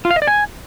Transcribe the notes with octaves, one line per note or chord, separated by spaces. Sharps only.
F4
F5
D#5
D5
G#5